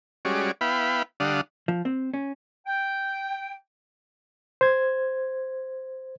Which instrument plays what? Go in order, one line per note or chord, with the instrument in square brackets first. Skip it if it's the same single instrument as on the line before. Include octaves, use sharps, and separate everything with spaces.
[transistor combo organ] G3 G#3 C#4 F#4 D5
B3 E4 F5 G5 B5
D3 G3 D4 F5 F#5 D#6
[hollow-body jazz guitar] F3
C4
C#4
[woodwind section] G5
[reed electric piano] C5 G#6